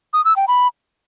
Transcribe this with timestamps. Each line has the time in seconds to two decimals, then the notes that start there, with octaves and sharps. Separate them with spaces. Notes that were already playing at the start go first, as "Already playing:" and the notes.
0.13 D#6
0.25 E6
0.36 G5
0.48 B5